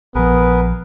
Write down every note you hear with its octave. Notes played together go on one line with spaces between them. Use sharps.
A#1 F3 B3 G#4 A#4 B4